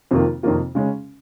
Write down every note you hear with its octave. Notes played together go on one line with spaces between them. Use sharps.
F2 C3 D#3 A#3 F4
F2 C3 D#3 A#3 F4
C#3 G#3 C#4